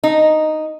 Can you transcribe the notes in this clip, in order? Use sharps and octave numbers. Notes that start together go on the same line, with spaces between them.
D#4